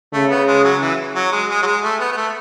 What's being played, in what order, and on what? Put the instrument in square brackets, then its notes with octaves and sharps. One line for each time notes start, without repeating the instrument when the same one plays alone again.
[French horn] C#3 [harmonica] A3
[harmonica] B3
G#3
F#3
E3
F#3
G#3
G#3
F#3
G#3
A3
B3
B3
A3